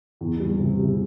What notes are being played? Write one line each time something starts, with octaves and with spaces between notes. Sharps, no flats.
E2
G3
C3
C3